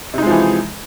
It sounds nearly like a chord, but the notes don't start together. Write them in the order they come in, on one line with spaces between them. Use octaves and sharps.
C3 D#4 G#3 F3 E3